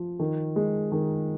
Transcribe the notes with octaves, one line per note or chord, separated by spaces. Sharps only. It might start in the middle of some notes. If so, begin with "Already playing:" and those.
Already playing: F3
D#3
G#3
D#3